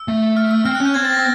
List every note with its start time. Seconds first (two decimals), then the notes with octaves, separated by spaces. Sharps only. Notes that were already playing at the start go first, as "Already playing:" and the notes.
Already playing: E6
0.08 A3
0.37 F6
0.51 E6
0.65 C4 F6
0.75 F#6
0.80 C#4
0.85 G6
0.94 C4 G#6
1.04 A6
1.14 A#6